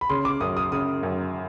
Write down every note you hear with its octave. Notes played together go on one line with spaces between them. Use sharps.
B5
C#3 C6
D6
F#2 D#6
D#6
C#3 D#6
F#2